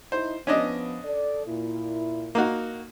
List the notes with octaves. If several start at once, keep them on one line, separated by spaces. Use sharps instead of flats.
D#4 E4 C5
F3 B3 C#4 D4 D#5
A4 D5
A#2 E4
A#3 D#4 F#4